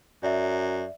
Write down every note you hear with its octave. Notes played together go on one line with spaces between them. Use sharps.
F#2 D5 E5